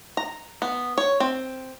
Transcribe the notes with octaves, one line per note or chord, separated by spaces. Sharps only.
A#5
B3
C#5
C4